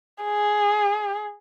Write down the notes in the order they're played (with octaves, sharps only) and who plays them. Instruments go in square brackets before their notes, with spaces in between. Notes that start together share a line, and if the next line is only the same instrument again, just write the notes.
[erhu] G#4